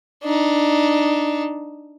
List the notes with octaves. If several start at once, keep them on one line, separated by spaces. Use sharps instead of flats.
D4 D#4